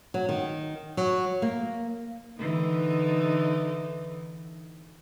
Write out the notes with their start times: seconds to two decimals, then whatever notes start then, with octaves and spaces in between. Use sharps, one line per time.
0.14 F#3
0.29 D#3
0.97 F#3
1.42 A#3
2.36 D3 E3 D#4